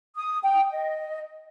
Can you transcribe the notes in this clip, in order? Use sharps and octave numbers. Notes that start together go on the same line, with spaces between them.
D#6
G5
D#5